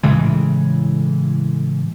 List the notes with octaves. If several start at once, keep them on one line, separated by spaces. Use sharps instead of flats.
A2 C#3 E3 G#3